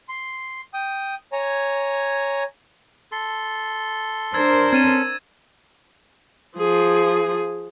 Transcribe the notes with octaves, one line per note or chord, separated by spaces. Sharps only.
C6
G5 D#6
C#5 G#5 A#5
A4 C6
D4 A#4 C5 E6 G#6 A6
C4 C#4 A4 G#6 D#7 E7
F3 G#4